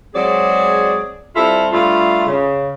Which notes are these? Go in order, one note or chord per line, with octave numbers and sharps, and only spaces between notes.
F#3 G#3 C4 G#4 D5
G3 C4 E4 F4 A4
G2 G3 A3 F4
C#3